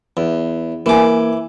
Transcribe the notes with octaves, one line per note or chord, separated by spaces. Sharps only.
E2
E3 A#3 G#5 D6